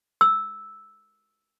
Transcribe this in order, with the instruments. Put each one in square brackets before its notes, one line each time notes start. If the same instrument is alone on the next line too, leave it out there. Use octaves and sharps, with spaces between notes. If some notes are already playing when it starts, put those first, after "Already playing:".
[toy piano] E6